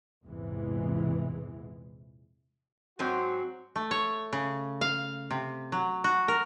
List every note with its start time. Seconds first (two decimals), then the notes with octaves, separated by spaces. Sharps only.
0.24 A#1 E2 G#2 C3 E3 G#3
2.99 G#2 F#3 C4 F#4
3.76 A3
3.91 C#5
4.33 C#3
4.81 F5
5.31 C3
5.72 F#3
6.04 F#4
6.28 A#4